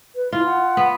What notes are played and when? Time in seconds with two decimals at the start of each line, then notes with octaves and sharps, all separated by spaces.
0.15 B4
0.32 E4 F4
0.46 F#5
0.77 B3